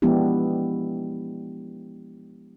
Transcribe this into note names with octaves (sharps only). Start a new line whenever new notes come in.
F3 G#3 B3 D4 E4 G4